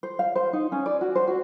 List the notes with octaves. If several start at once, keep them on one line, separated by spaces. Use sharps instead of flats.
C5
F5
C5
D#4
C#4
D5
F#4
C5
F#4